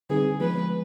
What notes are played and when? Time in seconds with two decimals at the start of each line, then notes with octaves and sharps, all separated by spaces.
0.10 D3 G3 C4 D#4 G#4 B4
0.40 F3 G#3 B3 B4